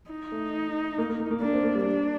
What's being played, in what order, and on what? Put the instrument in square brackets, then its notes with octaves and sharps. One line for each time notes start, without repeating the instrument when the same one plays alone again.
[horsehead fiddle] D#4
[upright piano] A3
A#3
A#3
A#3
A#3
[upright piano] A#3 [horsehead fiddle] D4
[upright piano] C4
A#3
G3
[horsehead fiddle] D4